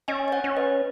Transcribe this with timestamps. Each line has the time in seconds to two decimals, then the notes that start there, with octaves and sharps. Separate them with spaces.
0.08 C#4 D#5 G#5
0.28 D#5
0.32 C#5 F#5
0.44 C#4
0.57 B4 D#5